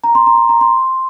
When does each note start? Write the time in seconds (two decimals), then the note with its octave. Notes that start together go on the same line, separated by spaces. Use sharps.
0.04 A#5
0.15 C6
0.27 A#5
0.37 C6
0.49 A#5
0.61 C6